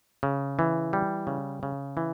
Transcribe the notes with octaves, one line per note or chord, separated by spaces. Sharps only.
C#3
E3
G3
C#3
C#3
E3